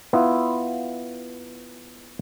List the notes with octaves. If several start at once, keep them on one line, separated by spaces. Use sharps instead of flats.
B3 E4 F4